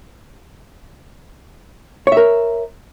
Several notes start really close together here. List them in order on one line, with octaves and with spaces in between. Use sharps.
C#5 E5 A#4